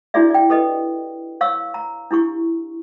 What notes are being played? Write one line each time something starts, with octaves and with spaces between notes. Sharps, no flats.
D4 E4 F#4 G#4 D5 E5
D5 G5
G4 A4 B4 D#5
C#5 F5 C#6 E6
A#5
D4 E4 G4 C#6